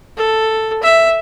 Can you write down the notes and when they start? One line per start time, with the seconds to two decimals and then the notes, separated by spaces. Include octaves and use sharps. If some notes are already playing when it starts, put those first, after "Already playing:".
0.17 A4
0.83 E5